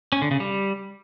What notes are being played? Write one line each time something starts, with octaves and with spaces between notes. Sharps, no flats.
C#4
D3
C#3
G3